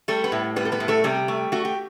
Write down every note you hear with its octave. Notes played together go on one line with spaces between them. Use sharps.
G3 A3 A4
B3 B4
A2
G3 B3 B4
A4
B3 B4
A2
A3 A4
C3 G3 G4
A3
A3 F#4
G4